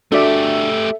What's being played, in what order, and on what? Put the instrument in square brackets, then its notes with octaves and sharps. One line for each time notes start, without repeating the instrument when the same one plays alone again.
[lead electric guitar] A3 G4 [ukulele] D4 F#4 D5 [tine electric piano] A4 E5